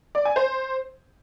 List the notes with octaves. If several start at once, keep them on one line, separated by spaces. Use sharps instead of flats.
D5
G#5
C5